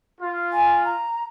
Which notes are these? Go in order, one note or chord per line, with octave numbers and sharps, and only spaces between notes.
F4
G#5
A#5